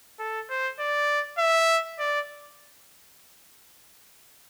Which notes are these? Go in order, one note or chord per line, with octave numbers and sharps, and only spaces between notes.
A4
C5
D5
E5
D5